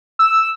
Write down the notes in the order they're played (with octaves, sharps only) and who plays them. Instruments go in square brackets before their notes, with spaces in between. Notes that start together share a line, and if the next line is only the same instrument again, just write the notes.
[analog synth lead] E6